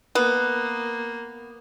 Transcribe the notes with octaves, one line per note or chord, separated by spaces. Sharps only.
A#3 B3